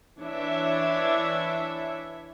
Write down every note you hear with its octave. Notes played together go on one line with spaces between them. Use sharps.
E3 D4 C#5 E5